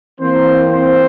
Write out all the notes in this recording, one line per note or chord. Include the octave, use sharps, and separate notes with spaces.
E3 A#3 C4 C5
C4 C5